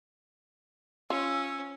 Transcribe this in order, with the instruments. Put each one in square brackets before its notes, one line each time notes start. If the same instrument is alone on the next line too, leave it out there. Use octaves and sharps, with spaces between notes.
[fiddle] C#4 [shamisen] F4 [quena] E6